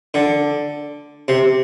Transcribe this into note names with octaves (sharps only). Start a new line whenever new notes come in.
D3
C3